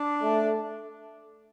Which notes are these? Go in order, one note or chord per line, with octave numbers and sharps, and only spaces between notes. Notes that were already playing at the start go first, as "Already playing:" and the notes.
Already playing: D4
A3